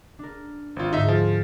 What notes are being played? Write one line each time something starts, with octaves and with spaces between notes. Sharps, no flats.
D4 A#4
G#1 F4
D2 G#2 D#4 E5
F3 G#5